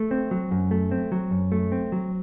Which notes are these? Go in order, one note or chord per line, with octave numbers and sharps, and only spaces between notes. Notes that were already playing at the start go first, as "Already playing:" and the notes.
Already playing: A3
C4
F#3
F#2
A3
C4
F#3
F#2
A3
C4
F#3